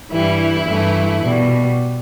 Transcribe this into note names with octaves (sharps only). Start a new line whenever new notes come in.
G2 E3 G3 E4
G2 E3 A3
B2 G3